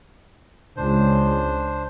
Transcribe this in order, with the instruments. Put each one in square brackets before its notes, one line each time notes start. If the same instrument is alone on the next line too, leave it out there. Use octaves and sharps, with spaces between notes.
[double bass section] C#2 [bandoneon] D4 C5